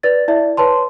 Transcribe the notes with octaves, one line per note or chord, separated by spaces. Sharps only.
B4 D5 A6
E4 D5 E5
B4 C#5 A5 C6